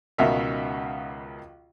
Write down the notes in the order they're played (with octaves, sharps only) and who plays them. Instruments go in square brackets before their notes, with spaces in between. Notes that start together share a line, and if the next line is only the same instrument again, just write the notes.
[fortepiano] C#2 B2 D#3 F#4 E5 F5